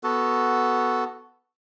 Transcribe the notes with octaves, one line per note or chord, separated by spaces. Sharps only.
B3 F#4 A4